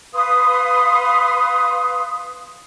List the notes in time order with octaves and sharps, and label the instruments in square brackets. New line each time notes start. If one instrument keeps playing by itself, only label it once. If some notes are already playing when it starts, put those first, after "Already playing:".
[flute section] B4 F5 C6 D#6